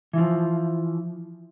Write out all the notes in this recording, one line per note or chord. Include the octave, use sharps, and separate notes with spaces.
E3 F3